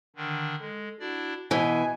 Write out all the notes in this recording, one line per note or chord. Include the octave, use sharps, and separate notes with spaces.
D3 D#3 D4
G#3 A4
D4 E4 F#4 D5
B2 E3 D#5 E5 G#5